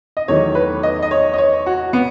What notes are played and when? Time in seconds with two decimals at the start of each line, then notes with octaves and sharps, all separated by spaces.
0.17 D#5
0.28 E2 D#3 F#3 A3 C#5
0.55 B4
0.83 D#5
1.03 D#5
1.11 C#5
1.34 D#5
1.38 C#5
1.66 F#4
1.93 B3